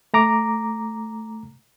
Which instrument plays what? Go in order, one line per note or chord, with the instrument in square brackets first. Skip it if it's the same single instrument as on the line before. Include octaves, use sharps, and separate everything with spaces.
[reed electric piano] A3 A#5 D6